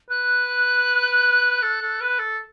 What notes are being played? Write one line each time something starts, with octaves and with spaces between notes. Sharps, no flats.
B4 F#6
A4
A4
B4
A4